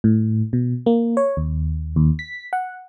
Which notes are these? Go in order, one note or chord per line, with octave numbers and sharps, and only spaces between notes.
A2
B2
A#3
C#5
D#2
D#2
B6
F#5